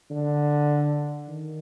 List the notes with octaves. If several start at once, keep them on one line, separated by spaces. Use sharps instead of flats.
D3
D#3